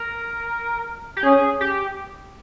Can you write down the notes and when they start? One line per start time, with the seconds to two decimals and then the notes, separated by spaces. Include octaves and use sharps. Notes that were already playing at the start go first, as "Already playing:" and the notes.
Already playing: A#4
1.17 G4
1.23 C#4 G#4
1.61 G4